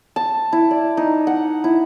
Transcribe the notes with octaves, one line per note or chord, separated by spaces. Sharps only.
A5
E4
D5
D#4
F#5
E4